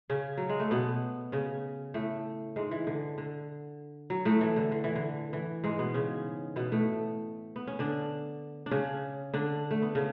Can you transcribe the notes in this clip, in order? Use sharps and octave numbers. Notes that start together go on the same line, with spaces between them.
C#3 C#4
F#3
G#3
A3
B2 B3
C#3 C#4
A2 A3
G#2 G#3
E3
D3
D3
F#3
A2 A3
E3
D3
D3
E3
D3
E3
G#2 G#3
B2 B3
C#3 C#4
B2 B3
A2 A3
B3
C#4
D3 D4
D4
C#3 C#4
D3 D4
A3
B3
C#3 C#4